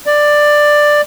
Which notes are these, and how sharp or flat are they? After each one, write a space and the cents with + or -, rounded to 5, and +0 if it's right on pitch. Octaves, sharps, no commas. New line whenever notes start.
D5 +10